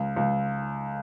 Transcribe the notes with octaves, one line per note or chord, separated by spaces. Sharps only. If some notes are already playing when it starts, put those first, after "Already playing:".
Already playing: C#2
C#2